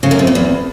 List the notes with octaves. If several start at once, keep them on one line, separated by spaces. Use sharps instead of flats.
C#3
F#2
C3
A#2
E2